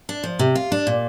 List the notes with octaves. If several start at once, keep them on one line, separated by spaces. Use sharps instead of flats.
D4
F3
C3
F4
D4
A#2